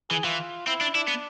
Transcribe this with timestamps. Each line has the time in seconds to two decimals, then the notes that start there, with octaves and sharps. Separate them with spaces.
0.10 E3 G#4
0.24 E3 F4
0.67 C4 E4
0.81 D4
0.95 D4 E4
1.08 B3